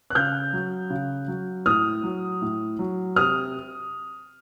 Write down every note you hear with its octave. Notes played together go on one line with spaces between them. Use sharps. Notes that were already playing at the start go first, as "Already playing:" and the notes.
F#6
C#3 F6 G6
F#3
C#3
F#3
A2 D#6 F6
F#3
A2
F#3
C3 D#6 F6